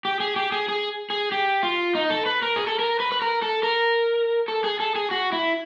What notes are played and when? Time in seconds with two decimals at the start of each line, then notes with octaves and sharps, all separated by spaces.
0.05 G4
0.20 G#4
0.36 G4
0.52 G#4
0.68 G#4
1.10 G#4
1.32 G4
1.63 F4
1.95 D#4
2.10 A4
2.26 B4
2.42 A#4
2.56 G#4
2.67 A4
2.79 A#4
3.00 B4
3.12 B4
3.22 A#4
3.42 A4
3.63 A#4
4.48 A4
4.64 G#4
4.80 A4
4.95 G#4
5.11 F#4
5.33 E4